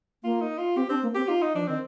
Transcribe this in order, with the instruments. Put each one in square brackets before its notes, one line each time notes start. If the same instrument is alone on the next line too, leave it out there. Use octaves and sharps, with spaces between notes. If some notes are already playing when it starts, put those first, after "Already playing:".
[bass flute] A#3 [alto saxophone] F4
[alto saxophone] D#4
F4
[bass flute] C4 [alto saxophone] G4
[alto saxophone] C4 [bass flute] D4
[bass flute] A#3
[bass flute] C4 [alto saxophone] G4
[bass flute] D#4 [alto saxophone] F4
[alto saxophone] D#4
[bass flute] F3 [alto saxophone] D4
[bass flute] D#3 [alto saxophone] C4